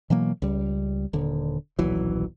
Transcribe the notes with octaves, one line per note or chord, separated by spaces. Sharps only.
B2 E3 F#3 A#3
C#2 G3
D#1 D3
D#1 B1 E3 F#3